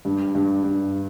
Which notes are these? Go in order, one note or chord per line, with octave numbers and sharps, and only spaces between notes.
G2
G2
G2